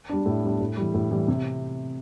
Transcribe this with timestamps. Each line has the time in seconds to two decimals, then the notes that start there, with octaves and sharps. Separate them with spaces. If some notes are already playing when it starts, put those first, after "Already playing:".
0.09 G3 D4
0.26 A2
0.43 G3 D4
0.60 A2
0.77 E3 G3
0.94 A2
1.11 E3 G3
1.28 C3